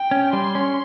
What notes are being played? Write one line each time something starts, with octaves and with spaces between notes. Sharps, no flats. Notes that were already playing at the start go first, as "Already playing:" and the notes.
Already playing: G5
C#4
G3 C6
C#4